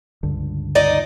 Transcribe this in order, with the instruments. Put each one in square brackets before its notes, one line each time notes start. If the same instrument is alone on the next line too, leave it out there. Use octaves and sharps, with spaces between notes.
[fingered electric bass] C#2 G2 D3
[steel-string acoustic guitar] D#4 D5 D#5